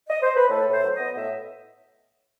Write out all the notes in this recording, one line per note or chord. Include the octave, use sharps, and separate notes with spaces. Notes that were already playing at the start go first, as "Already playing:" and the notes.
D#5
C5
B4
A2 A4
A2
C5
F#3
B3 D#5
A2 E5